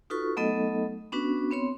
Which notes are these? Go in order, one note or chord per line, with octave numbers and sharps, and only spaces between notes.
D#4 F4 F#4 A4 B4 C#6
F#3 A3 B3 D#4 A4 D#5
B3 C#4 D4 F#4 B4
B3 C4 C#5 C6